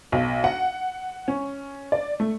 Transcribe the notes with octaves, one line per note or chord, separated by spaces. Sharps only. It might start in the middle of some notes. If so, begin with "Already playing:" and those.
B1
F#5
C#4
D5
A3